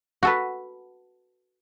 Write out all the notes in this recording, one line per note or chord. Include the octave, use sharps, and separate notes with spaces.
F#4 A4 B4